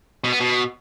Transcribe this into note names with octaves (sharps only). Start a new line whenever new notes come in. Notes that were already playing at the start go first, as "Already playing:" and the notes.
B2
B3
B2